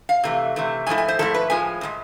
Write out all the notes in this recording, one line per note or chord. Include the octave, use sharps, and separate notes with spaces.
F5
C3 E3 A3
C3 E3 A3
G#2 F3 A3 E4 G#5
G#5
C5
G#2 F3 A3 E4 A4
B4
A2 F3 G#3 G#5
A2 F3 G#3